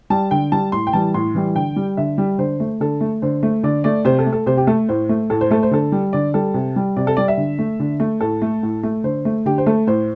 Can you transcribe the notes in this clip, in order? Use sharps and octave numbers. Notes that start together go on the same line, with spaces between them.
G3 A5
D3 G5
G3 A5
A2 C6
G5
E3 G3 A5
A2 C6
E3 G3
D3 G5
G3
D3 E5
G3
D3 C5
A3
D3 A4
A3
D3 C5
A3
D3 D5
A3 D5
C3 C5
A4
A3
A4
C3 C5
G4
A3 A4
A2 C5
A3
A2 A4
C5
A3 A4
C5
D3 A4
G3
D3 D5
G3 A4
C3
G3
C3 D5
A4
G3 D5
E5
D3
A3
D3
A3
A2 A4
A3
A2
A3
D3 C5
A3
D3 G4
C5
A3 A4
A2 C5